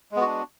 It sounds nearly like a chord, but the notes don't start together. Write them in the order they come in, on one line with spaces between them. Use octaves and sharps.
G#3 B3 F#4 D4